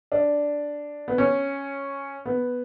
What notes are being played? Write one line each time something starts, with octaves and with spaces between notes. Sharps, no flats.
D4
B3
C#4
B3